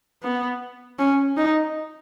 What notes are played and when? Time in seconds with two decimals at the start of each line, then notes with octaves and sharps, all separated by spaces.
0.23 B3
0.99 C#4
1.37 D#4